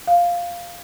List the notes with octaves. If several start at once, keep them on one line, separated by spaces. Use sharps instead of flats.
F5